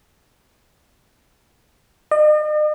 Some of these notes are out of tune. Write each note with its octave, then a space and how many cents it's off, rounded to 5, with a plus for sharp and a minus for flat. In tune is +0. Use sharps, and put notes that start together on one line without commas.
D#5 -45